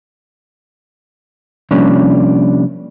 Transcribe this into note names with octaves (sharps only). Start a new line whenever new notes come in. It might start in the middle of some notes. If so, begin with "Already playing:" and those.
C3 F3 G3 A#3 C#4 D4